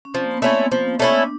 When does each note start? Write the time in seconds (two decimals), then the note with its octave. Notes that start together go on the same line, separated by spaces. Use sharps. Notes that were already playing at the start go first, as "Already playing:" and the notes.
0.05 C#4
0.14 F3 C4
0.24 A#3
0.34 B3
0.42 A3 C4 C#4 E4
0.72 F3
0.99 A3 C#4 E4
1.23 D4